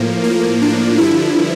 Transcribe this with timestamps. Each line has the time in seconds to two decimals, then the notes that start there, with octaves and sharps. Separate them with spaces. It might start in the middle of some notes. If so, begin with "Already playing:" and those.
Already playing: A2 F3 A#3
0.24 A#3
0.62 D4
0.97 G2 D3 F3 E4